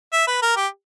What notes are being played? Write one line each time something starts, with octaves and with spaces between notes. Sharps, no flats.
E5
B4
A#4
G4